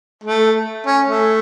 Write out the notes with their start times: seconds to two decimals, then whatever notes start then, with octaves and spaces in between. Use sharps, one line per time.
0.24 A3
0.86 C#4
1.07 A3